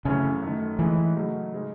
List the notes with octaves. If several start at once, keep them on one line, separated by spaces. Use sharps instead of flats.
F#2 C#3 E3 A3 C#4
F#2 D#3 A3
A2 E3 G#3 D#4
C#3 F#3 A3 D#4
C#3 G#3 D#4